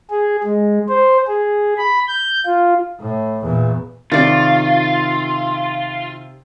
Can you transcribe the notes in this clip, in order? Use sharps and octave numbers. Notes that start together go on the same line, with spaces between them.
G#4
G#3
C5
G#4
B5
G6
F4
A2
E2 A#2
C3 D#3 F4 D5 A6